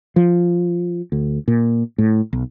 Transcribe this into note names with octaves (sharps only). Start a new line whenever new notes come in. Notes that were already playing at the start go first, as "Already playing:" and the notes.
F3
D2
A#2
A2
B1